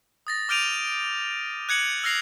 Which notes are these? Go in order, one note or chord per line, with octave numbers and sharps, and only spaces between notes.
D#6 A6 A#6
D6 F6 G6 D7 D#7 F7
F#6 G#6 C#7 F#7
E6 F6 A#6 C7 F7 F#7